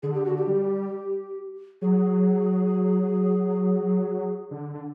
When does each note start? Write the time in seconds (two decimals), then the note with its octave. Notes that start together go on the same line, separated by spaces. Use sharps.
0.03 D3 G#4
0.14 G4
0.26 F#4
0.37 G4
0.47 G3
1.82 F#3 G#4
4.51 D3
4.74 D3